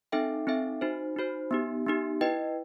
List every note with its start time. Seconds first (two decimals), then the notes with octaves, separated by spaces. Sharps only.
0.12 C4 D#4 A4 E5 G5
0.47 C4 D#4 A4 E5 G5
0.81 D#4 F#4 C5
1.16 D#4 F#4 C5
1.51 B3 D#4 G4
1.86 B3 D#4 G4
2.21 E4 B4 D#5 G5